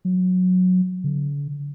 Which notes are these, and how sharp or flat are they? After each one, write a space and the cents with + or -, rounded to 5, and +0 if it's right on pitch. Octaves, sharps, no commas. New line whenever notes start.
F#3 -15
D3 -40